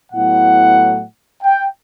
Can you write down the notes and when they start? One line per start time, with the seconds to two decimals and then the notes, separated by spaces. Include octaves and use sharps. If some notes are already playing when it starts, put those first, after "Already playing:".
0.11 A2 F#3 B3 E4 F#5
1.43 G5